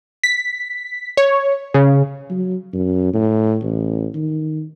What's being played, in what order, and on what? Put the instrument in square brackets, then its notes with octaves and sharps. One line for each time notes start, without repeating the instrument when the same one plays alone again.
[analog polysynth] B6
C#5
C#3
[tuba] F#3
F#2
A2
A1
D#3